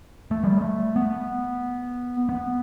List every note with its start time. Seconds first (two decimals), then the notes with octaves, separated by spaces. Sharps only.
0.31 A3
0.44 G3
0.57 A3
0.96 B3
2.29 B3